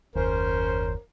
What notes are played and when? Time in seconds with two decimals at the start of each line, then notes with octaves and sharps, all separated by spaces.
0.15 F#1 D#2 C#4 A#4 C5